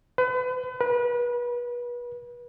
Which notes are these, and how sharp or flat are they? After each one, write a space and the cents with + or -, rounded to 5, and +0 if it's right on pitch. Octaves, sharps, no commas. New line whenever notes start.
B4 +40
B4 -30